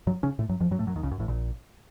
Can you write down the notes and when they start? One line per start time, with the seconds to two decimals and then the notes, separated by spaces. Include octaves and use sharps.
0.07 F#2 F#3
0.23 C#3 C#4
0.39 A2 A3
0.49 F#2 F#3
0.60 F2 F3
0.71 F#2 F#3
0.79 A2 A3
0.87 F#2 F#3
0.96 D#2 D#3
1.03 C#2 C#3
1.11 F#2
1.19 A1 A2
1.28 A#1 A#2